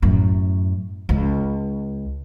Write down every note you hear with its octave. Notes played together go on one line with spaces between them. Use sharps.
F#2 A2
C#2